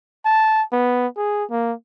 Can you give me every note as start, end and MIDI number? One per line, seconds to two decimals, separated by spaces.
0.26 0.63 81
0.73 1.07 59
1.17 1.44 68
1.50 1.73 58